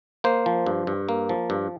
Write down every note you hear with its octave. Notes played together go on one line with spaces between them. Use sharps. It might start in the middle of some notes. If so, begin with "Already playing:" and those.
A#3 C5
F3
G2
G2
A#3
F3
G2